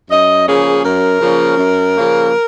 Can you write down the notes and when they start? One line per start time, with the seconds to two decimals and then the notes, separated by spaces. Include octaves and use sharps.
0.10 F#2 D#5
0.47 C#3 F3 A#3 C#4 G#4
0.83 F#2 A#4
1.20 C#3 F3 A#3 C#4
1.57 F#2
1.93 C#3 F3 A#3 C#4